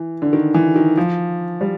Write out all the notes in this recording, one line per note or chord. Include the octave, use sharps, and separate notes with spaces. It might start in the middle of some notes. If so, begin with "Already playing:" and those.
Already playing: E3
D3
D#3
E3
D#3
F3
G3